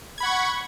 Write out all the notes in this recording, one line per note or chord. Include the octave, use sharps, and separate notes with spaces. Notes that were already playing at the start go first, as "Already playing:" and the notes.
F#5 B5 C#6 G#6